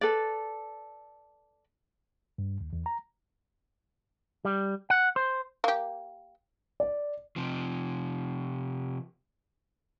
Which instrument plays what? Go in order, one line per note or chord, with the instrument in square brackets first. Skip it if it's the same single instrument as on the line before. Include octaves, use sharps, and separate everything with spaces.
[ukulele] A4 B4 D5
[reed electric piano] G2
D#2
E2
A#5
[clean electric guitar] G3
F#5
C5
[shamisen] A#3 G4
[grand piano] D5
[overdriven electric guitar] C3 F3